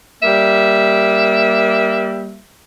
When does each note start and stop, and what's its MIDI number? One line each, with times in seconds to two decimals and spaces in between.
0.23 2.39 55
0.23 2.39 58
0.23 2.39 76